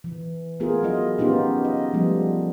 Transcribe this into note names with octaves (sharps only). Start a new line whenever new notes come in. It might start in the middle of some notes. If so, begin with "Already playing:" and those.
E3
A3 B3 E4 F4 G#4 A#4
F#3 E4 F4 D#5
B3 C#4 D#4 F4 G4
D#5
F3 G3 A3 B3